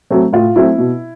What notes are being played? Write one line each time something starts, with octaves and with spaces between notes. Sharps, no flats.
F#3 A3 C4
A2 F4
F#3 A3 C4 E4
B2